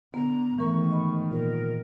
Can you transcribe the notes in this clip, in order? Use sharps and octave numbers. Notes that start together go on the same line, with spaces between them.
D3 B3 A#5
G#2 D#3 E3 A3 A#4 C#6
D#5 B5
A#2 A#4